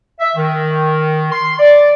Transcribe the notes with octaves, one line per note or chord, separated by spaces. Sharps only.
E5
D#3
C6
D5